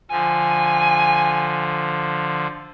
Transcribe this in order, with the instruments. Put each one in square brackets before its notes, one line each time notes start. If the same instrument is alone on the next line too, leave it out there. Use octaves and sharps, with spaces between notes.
[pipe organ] D3 F3 [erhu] G#5